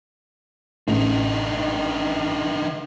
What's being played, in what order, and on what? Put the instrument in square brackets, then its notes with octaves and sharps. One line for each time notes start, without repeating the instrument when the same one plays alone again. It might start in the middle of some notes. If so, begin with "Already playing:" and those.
[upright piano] A1 [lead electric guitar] D3 D#4